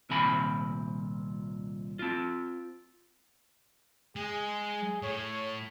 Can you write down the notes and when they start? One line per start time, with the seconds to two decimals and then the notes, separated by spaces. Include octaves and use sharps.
0.10 C2 A#2 D#3 C4 G#5 B5
1.99 C4 F4
4.16 G#3 G#4
5.03 A2 C#5